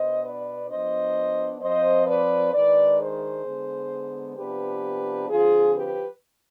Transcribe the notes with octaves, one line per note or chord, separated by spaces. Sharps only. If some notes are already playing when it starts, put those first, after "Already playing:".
Already playing: B2 B3 D4 C5 D#5
B4 D5
F3 B3 D4 C5 D#5
F3 C4 C5 D#5
B4 D5
D#3 G#3 D4 B4 D5
G#4 C5
D3 G#3 B3
C3 F3 B3 D4 G4 B4
D3 F3 C4 F4 G#4
G4 B4